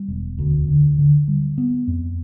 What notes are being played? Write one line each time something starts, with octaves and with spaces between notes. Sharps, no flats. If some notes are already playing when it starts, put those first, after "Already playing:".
Already playing: G3
E1
D2
D3
D3
G3
B3
F2